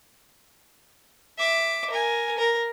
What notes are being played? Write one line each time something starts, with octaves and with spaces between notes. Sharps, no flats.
E5 D6
A#4 G#5
A#4